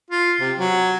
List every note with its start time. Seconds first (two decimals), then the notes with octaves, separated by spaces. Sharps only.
0.10 F4
0.40 C3
0.58 F#3